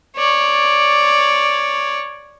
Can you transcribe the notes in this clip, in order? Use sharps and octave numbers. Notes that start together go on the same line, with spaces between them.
C#5 D5